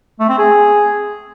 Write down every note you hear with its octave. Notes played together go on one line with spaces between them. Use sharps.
A3
C4
G#4